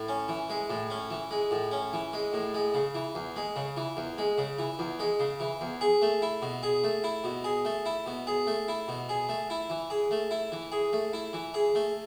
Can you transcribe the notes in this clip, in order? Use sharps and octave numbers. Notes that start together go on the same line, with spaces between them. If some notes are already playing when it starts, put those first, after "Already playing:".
Already playing: A2
C#4
E3
G#3
A2
C#4
E3
G#3
A2
C#4
E3
G#3
A2
G#3
C#3
E3
E2
G#3
C#3
E3
E2
G#3
C#3
E3
E2
G#3
C#3
E3
E2
G#4
A3
E4
B2
G#4
A3
E4
B2
G#4
A3
E4
B2
G#4
A3
E4
B2
G#4
A3
E4
E3
G#4
A3
E4
E3
G#4
A3
E4
E3
G#4
A3